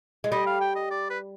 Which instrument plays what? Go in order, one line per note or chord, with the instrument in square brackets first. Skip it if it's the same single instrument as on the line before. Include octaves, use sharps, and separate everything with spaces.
[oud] G#3
[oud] G3 [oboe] D#5
[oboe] F5
G5
D#5
D5
B4